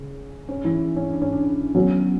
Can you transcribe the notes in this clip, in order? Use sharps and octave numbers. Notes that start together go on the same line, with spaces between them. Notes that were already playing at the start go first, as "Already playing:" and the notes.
Already playing: C#3 C#4
C#4 C#5
E3 E4
C#4
D4
C#4
D4
F#3 B3 C#4 F#4